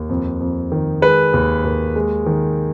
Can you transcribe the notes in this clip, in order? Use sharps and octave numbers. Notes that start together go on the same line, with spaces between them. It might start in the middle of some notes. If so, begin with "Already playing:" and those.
Already playing: D#2
F2
F2
D#3
G#3 B4
D#2
D#2
G#3
D#3